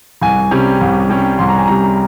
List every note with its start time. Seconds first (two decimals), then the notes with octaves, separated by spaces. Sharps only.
0.22 C2 G#5
0.51 C3 G3 C#4
0.81 C2
1.10 C3 G3 C#4
1.39 C2 C6
1.49 A#5
1.58 G#5
1.68 C3 G3 C#4 A#5